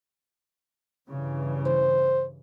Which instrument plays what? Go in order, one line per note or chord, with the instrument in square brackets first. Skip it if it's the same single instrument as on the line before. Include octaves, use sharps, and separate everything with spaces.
[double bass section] G2 C#3 E3
[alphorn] C5